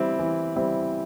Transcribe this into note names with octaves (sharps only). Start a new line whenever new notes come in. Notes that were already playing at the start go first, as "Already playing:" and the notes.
Already playing: E3 G3 C4 E4
E3
G3 C4 E4